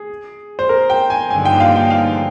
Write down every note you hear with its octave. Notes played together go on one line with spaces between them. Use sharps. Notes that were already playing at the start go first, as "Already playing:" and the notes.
Already playing: G#4
C5
A#4
G5
G#5
G2 D3 F3 A#3 D#4 G#5
G5
F5
G5
F5